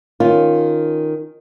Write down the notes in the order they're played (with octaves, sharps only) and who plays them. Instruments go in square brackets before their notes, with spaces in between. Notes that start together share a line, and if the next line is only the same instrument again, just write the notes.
[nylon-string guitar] D#3 C#4 F4